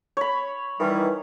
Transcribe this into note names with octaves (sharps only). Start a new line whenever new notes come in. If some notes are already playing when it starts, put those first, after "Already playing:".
C#5 B5
D#3 E3 G3